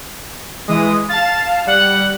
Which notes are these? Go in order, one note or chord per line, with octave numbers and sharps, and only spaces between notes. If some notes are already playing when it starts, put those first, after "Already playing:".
E3 G#3 D#6
F5 A5 A6
G3 F#5